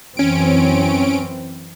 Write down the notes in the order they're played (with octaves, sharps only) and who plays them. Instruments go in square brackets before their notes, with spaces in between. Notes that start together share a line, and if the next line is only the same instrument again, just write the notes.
[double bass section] F#2 E3 C4 [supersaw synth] C#4 D7